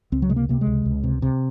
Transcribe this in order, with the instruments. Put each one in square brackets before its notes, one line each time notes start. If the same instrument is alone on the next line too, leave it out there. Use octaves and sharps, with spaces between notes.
[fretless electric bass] C#2 C4
F#3
C3 G#3
A#3
C3 A#3
G#3
C#2
C#2
C3
C3